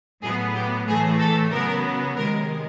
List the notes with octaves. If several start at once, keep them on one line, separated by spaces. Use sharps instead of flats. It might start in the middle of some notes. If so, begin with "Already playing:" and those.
A2 F#3 B3 G#4
G4
A2 E3 A3 G#4
A4
C#3 F#3 B3 A#4
C3 D#3 G#3 A#4